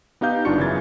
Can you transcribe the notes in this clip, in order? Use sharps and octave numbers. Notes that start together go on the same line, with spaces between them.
B3 D#4 G4 F5 G6
G1 B3 D4 F4 C#6 C#7
F#2 C#3 E3 G#6 A6